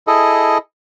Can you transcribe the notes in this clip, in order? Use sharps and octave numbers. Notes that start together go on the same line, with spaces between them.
E4 G#4 A4 D#5